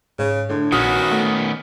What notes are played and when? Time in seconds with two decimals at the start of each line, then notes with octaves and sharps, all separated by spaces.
0.19 G#2 C#3
0.49 A2 D3
0.72 A#1 D#3 B3 C#4 F#4 D#6 F6
1.12 A3